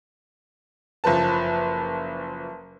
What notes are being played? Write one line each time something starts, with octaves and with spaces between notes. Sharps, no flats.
F#1 F3 B4 A5